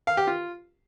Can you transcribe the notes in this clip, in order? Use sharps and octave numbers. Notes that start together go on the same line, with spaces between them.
F5
G4
F4